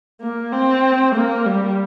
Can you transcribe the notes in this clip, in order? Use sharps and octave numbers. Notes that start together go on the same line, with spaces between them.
A#3
C4
A#3
G3